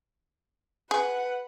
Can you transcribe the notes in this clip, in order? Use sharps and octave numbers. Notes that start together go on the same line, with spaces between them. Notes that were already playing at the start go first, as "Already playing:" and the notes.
G#4 B4 F#5